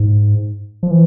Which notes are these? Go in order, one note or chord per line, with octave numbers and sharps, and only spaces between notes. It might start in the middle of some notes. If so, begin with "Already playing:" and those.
Already playing: G#2
F3
E3